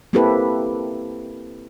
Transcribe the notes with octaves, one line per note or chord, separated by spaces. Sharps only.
A#3 C4 E4 G4 A4 B4